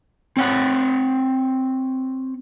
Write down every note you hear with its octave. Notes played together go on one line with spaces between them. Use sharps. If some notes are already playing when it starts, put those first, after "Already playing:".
C4 C#5 F#5